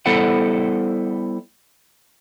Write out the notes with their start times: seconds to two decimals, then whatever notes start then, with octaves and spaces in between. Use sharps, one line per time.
0.06 G3 B3 E4 A4 C5 F#5